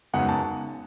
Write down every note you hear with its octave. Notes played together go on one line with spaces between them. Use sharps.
F#2 C#3 G#3 B3 D#4 F#5
A5